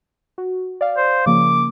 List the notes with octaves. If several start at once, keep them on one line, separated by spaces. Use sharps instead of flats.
F#4
D5 F5
C5
C#3 F3 A#3 D6